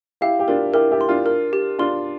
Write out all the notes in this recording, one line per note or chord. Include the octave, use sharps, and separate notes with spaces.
E4 G4 F5
G4
D4 F4 A#4
E4 G4 A#4
E4 G4
C6
D4 F4
A#4
G4
D4 F4 C6